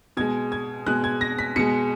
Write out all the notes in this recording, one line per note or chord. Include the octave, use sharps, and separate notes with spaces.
B2 G#3 G#6
G#6
B2 G#3 F#6
G#6
A#6
B6
B2 G#3 C#7